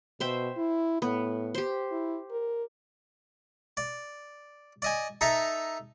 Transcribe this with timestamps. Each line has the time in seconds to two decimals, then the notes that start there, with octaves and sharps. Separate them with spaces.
0.20 B2 C5 E5 G5
0.57 E4
1.02 A2 B3
1.55 G4 C5
1.91 E4
2.31 A#4
3.77 D5
4.82 D5 D#5 G#5
5.21 D#4 A4 E5 A5 A#5